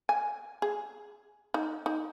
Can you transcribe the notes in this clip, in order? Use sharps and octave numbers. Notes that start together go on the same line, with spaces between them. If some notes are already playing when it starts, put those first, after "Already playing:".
G#5
G#4
D#4
D#4